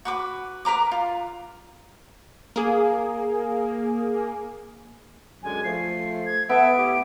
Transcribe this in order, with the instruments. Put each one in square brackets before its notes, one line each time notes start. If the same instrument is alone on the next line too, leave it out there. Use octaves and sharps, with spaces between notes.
[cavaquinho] F#4 B4 D6
A#4 B4 A#5 D6
F4
[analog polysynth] A#3 G#4
[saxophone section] F#2 D3 G#3 [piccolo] G#5
[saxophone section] F3 A3 [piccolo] C7
[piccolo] G#6
[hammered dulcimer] B3 [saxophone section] A4 E5 [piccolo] D7
[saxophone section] A2 E4 G4